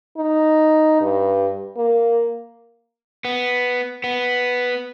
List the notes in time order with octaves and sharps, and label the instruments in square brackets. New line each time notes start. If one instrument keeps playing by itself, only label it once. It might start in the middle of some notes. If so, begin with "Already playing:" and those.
[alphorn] D#4
G2
A#3
[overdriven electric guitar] B3
B3